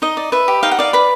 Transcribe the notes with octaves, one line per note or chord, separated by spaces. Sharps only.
D#4 D#5
D5
B4 E5
G4
D#4 F5
F#5
D5 F5
B4 B5